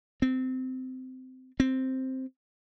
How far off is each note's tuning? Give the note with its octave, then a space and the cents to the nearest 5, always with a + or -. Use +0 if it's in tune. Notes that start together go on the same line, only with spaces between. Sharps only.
C4 -20
C4 +0